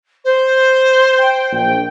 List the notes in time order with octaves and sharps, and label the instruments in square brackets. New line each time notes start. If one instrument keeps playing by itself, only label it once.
[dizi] C5
[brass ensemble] G5
A#1 G5